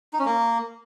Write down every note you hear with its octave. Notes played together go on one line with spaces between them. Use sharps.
D#4
C#4
A#3